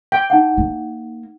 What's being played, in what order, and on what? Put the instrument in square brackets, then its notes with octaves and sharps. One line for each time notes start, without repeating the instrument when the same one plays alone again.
[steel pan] G5
[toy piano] D#4 E4 F#5
[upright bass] A#3